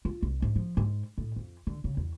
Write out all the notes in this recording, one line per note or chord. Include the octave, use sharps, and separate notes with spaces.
F4
C2
G#2
F3
G#2
A2
F2
D3
C#3
E2